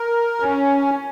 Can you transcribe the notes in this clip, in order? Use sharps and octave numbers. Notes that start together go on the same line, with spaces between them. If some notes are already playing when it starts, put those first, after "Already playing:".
Already playing: A#4
C#4